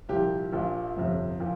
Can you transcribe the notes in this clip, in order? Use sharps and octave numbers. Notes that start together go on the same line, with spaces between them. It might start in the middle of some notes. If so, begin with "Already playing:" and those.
C2 A#2 F3 G4
A#1 A#2 F3
G1 F2 C3 F3
A#2 F3